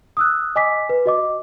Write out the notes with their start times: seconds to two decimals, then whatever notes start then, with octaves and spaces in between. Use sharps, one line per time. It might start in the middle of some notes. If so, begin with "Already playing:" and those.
0.17 D#6 E6 F#6
0.56 D#5 G#5 D6 B6
0.89 B4
1.06 F#4 D#5 D6